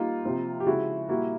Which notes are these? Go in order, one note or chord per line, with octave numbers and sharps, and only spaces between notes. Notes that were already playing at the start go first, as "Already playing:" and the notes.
Already playing: G3 A#3 D#4 F4
C3 F3 A#3
G4
C#3 F3 G#3 E4 F#4
A#2 G3 A#3 E4 F#4